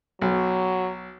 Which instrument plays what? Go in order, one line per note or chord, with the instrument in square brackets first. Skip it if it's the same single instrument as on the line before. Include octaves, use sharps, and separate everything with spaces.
[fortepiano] B1 [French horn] F#3